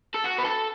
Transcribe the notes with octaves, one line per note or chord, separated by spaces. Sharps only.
A4
F#4
B4
A4